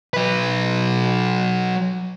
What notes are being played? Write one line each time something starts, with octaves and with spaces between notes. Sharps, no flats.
F#3 B4